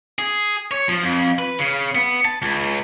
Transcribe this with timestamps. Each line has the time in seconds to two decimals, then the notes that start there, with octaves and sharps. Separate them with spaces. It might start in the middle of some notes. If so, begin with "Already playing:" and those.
0.19 G#4
0.71 C#5
0.89 F3
1.04 F2
1.39 B4
1.59 C#3
1.95 B3
2.25 A5
2.42 C#2